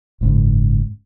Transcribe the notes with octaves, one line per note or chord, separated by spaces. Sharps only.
F#1 G#2 C#3